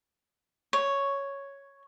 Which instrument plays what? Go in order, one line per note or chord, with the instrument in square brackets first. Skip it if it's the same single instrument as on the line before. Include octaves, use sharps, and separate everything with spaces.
[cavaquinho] C#5